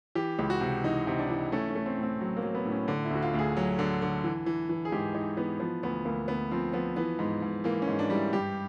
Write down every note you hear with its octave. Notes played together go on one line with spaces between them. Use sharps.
E3 G4
C#2
F#4
C3
E3 D#4
C3
D4
E3
A3 C#4
C#4
A3
C4
A2
C4
F#3
A#3
F#3
B3
A2
C#4
D3
E4
D2 F#4
F4
D2 G#4
F#3
D3
D3
E3
E3
E3
G#4
G#2 G4
E3 D#4
E3 B3
F3 B3
D2 B3
D2 A#3
D2 B3
F3 C4
F3 B3
E3 B3
G#2
G#2
E3 A#3
C#4
G#2
D4
G3
E4
G2 G4